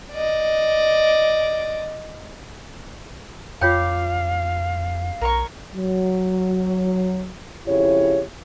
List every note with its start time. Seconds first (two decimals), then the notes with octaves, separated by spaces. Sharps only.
0.12 D5 D#5
3.61 F2 F4 C#5 F5 G5 D6
5.21 B1 A#4 C#5 C#6
5.75 F#3
7.66 F2 C#3 E4 G4 C#5